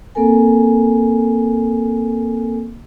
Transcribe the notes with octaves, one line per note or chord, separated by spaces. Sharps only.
A#3 C4 A4 A#4 G#5